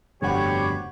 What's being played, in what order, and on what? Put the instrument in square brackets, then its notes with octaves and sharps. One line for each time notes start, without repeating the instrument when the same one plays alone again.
[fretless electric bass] F1 G2 D3 [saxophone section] B3 F#4 C5 [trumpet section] G4 [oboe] C#5